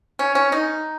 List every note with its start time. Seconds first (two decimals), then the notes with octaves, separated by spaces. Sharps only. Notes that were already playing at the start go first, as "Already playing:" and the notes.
0.19 C#4
0.35 C#4
0.52 D#4